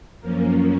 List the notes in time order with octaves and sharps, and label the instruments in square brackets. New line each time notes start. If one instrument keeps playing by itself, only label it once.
[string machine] F#2 F3 A#3 C#4 A#4